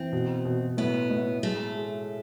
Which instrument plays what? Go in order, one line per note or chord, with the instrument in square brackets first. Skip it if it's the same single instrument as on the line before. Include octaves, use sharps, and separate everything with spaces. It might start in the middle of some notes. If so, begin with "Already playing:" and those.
Already playing: [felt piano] E3 [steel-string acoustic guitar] C4
[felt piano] B2
B2
[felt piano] A2 [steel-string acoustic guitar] B3
[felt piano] A2
[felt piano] G#3 [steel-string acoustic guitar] A3
[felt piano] G#3